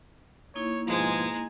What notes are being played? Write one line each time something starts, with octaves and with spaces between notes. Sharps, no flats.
A#3 D#4 E4 C#5
G#2 B2 F3 G#3 G#5 A#5